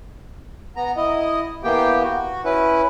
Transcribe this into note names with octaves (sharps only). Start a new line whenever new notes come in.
B3 A#5
E4 D#5
E3 A#3 B3 G4 G5
F#4
C#4 E4 B4